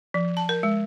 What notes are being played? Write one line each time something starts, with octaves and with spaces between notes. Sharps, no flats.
F3
A5
A#4
G#3